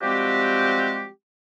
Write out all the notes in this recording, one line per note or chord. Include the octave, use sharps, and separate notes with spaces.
F3 G3 G#3 C4 F#4 G4